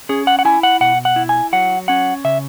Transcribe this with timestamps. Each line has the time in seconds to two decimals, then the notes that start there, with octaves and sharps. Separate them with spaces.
0.09 C#4 G#4
0.27 F#5
0.39 F#5
0.45 E4 G#5
0.63 F#5
0.80 B2 F#5
1.05 F#5
1.16 E4
1.29 G#5
1.53 F#3 F#5
1.88 C#4 F#5
2.24 C#3 E5